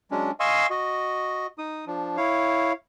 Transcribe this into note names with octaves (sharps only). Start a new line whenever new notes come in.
F#3 G#3 C#4 D4
D#5 F5 G#5 C6 C#6 E6
F#4 D#5
D#4 D#6
F3 D4
E4 C#5 F5